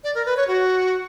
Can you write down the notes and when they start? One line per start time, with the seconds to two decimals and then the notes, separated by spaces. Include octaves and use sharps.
0.04 D5
0.15 A#4
0.26 B4
0.37 C#5
0.47 F#4